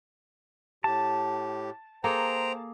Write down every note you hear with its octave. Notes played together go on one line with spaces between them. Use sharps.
A2 G4 A5
A#3 G#4 A4 C5 G5 A#5